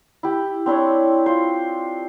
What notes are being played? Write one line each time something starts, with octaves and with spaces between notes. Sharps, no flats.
E4 G4
C4 D4 E4 C#5
F4 C5